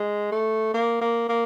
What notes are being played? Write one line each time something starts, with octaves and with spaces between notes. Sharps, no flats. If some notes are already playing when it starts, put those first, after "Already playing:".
Already playing: G#3
A3
A#3
A#3
A#3